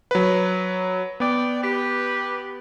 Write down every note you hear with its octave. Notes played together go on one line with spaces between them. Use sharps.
F#3 B4
B3 D5 G5
G4 B4